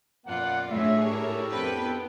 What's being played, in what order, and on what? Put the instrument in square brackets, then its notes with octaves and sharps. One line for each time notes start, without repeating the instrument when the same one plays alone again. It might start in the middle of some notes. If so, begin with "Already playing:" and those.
[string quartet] F#2 B2 F4 [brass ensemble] A#3 B3 F#5 [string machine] D5
[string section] A2 [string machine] D4 G#4 C#5 [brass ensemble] E5
[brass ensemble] D4 G4 A4 [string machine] E4 A#4 [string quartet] C#5 E5
[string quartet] F2 C4 G5 [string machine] B3 [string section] B4